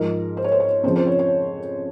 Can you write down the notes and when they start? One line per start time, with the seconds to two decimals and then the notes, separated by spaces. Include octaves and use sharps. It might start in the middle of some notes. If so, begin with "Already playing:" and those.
Already playing: G#2 F3 A#4
0.37 C5
0.44 C#5
0.52 C5
0.60 C#5
0.83 F2 C#3 F3 C5
0.96 C5
1.07 C#5
1.19 C#5